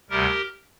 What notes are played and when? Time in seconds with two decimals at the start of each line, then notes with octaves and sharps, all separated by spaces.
0.10 D2 C3 G3 G4 A#4